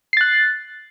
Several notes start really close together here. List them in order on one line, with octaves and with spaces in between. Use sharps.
C7 A6 F#6